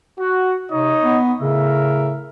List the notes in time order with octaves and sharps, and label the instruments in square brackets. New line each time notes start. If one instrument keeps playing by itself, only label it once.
[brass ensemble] F#4
[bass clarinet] C3 [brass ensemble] D#4 C#5 D#5
[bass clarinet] B3
[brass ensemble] A2 A#4 E5 [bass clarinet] C#3